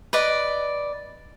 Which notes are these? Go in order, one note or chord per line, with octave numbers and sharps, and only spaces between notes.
B4 D5 D#5